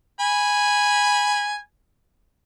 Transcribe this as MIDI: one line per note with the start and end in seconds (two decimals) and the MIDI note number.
0.20 1.59 80
0.20 1.59 83